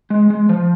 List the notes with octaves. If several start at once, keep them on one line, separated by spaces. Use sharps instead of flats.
G#3
G#3
F3